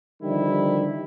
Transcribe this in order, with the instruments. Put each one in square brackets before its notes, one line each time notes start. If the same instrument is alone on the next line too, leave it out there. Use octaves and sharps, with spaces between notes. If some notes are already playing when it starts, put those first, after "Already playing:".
[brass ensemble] D3 D#3 F3 G3 E4